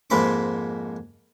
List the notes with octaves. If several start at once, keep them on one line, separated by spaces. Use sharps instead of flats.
F2 G#2 A#3 B5 C6 D6